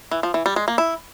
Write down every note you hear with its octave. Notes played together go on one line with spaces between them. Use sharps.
E3
F3
E3
G3
G#3
A#3
E4